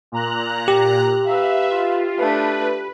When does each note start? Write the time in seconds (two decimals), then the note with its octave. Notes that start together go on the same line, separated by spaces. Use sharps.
0.12 A#2 A#5 F#6
0.68 G4
1.26 B4 E5 F5
1.71 F4
2.18 A3 D4 B4